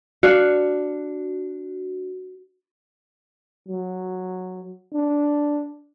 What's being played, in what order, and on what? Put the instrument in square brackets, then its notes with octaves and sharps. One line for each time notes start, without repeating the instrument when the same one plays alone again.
[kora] D4 F5 [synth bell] F#4
[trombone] F#3
D4